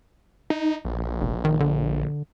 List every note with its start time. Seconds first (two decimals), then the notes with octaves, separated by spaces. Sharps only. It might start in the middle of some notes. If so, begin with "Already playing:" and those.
0.50 D#4
0.85 A#1
1.21 F1
1.45 D#3
1.60 D3